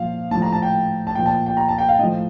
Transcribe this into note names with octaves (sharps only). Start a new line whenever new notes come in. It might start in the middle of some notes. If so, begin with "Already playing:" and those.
Already playing: A#2 F3 F5
A2 F3 A5
A#5
A5
G5
A5
A#2 F3 G5
A5
G5
A#5
A5
G5
F5
A2 F3 D#5